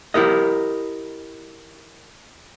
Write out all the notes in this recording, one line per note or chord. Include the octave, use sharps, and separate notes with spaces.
E4 G4 A#4 D#5